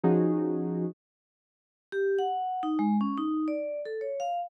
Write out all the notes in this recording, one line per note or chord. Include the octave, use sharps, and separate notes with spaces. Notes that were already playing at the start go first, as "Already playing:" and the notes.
F3 C#4 D#4 F#4 G#4
G4
F#5
D#4
G#3
C#4
D#4
D5
A4
C#5
F5